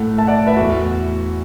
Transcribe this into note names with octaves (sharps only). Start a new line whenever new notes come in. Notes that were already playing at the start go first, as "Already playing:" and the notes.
Already playing: A2 A3 F#5
E5 A5
D5 F#5
B4 E5
E2 E3 A3 F#4